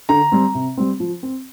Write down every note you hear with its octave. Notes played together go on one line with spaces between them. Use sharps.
D3 A#5
G3 C4
C3
G3 C4
F3
C4